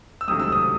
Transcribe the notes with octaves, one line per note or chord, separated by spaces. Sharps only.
E6
C#2 C3 D#3 F#3 A3 D#6
E6
D#6